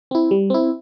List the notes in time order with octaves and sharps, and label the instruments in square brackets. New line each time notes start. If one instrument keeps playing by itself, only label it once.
[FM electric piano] C4 E4
G3
C4 E4